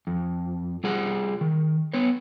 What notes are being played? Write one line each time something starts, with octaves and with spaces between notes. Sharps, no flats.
F2
G3 F4 G#4 F#5
D#3
B3 B4 C#5